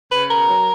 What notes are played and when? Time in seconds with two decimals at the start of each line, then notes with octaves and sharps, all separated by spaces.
0.11 C#3 B4
0.29 B2 A#4
0.48 F#3